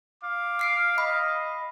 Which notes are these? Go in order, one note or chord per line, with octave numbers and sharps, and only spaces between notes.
F5 D6
F6 C7 D7
D#5 B5